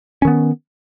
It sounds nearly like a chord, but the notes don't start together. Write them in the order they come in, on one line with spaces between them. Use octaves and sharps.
C#4 D#3 B3